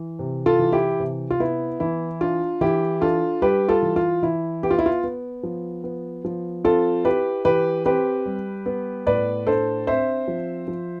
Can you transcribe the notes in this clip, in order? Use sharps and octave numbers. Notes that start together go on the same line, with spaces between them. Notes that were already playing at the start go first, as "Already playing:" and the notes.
Already playing: E3
C3
F4 A4
E3
E4 G4
C3
F4
B3 E4
E3 E4
D4 F4
E3 E4 G4
D4 F4 A4
G3 G4 B4
F4 A4
E3
F4
E3 E4
B3 G4
F4
E4
F4
B3
F3
B3
F3
C4 F4 A4
E4 G4 B4
E3 G4 B4
C4 G4 B4
G3
B3
A2 B4 D5
D4 A4 C5
C4 C5 E5
F3
F3